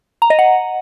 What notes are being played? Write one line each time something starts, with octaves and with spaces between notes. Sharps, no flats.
A#5
D#5
F#5